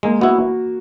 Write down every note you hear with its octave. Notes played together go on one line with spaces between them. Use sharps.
G#3 A#3
B3 E4 F#4